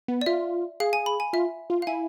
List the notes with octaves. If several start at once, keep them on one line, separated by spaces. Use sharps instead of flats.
B3
D5
F4 E5
G#4 F5
G#5
B5
G#5
F4 E5
F4
F5
E4 G#5